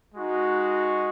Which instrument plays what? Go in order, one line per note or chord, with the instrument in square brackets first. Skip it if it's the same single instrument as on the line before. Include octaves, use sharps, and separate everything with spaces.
[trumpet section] G#3 D#4 F#4